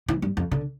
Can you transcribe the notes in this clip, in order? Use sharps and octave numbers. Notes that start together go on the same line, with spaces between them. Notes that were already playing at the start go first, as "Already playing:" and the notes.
E3
G2
F2
D3